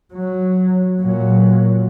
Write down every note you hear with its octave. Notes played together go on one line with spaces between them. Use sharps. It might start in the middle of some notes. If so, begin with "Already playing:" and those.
F#3
A#2 F#3